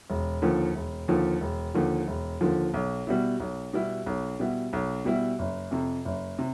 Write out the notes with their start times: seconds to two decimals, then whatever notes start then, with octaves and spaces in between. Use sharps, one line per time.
0.10 E1
0.42 D#2 D3 F3
0.75 E1
1.08 D#2 D3 F3
1.41 E1
1.74 D#2 D3 F3
2.07 E1
2.41 D#2 D3 F3
2.74 B1
3.07 B2 G3 B3 E4
3.40 B1
3.73 B2 G3 B3 E4
4.06 B1
4.40 B2 G3 B3 E4
4.73 B1
5.05 B2 G3 B3 E4
5.39 F#1
5.71 F2 C3
6.05 F#1
6.39 C3